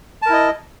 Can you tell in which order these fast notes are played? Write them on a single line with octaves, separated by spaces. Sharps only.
A5 A#4 E4 D#5